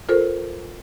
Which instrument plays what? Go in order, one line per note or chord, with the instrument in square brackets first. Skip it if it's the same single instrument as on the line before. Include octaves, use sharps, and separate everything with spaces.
[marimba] F4 A4 A#4 C5